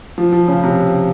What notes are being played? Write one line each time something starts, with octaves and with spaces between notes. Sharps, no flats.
F3
F3
C#3
C3